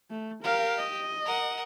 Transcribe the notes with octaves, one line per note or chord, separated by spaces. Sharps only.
A3
G4 A#4 F5
D#5
A#4 F#5